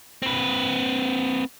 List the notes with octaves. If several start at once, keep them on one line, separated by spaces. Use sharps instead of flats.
C4 B4